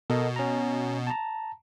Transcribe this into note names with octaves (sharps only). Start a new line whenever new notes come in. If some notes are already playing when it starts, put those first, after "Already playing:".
B2 A4 A#4 D#5
C#4 A#5
A5 A#5